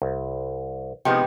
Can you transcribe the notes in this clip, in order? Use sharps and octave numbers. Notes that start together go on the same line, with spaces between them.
C2
C3 F3 G#3 B3 D#4 G5